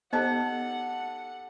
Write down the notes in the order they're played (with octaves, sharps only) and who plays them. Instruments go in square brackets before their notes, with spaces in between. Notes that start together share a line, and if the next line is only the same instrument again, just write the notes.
[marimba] B3 [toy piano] D#4 C5 D#5 [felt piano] G4 A4 A5 [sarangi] F#5